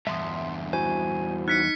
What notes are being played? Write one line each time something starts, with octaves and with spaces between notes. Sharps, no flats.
E2 G2 E5 C6 D#6
E4 F#4 C5 G#5
D#4 F#6 B6 C#7